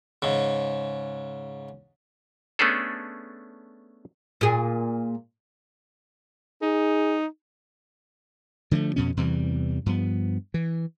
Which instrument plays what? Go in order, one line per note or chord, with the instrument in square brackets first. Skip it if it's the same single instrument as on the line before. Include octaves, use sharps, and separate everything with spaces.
[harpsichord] G#2 C#3
[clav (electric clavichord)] A3 B3 C#4 D4 G#4 A4
[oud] A#2 G#4
[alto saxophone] D#4 [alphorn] G#4
[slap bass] D3 F3 G#3 A3
F2 B2 C#4
E2 C3 E3 G3
G2 F3 B3
E3